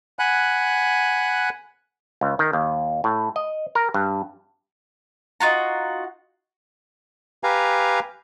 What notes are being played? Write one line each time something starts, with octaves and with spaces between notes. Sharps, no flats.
F#5 G#5 B5 F#6
C#2
D#3
D#2
A2
D#5
A#4
G2
D#4 F4 F#4 A#5
G4 B4 F5 G#5 A#5